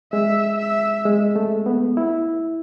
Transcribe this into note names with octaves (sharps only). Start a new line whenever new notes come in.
G#3 E5
E5
G#3
A3
B3
E4